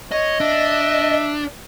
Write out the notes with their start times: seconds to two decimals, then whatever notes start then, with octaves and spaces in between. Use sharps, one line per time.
0.12 C#5 D#5
0.40 D4 E5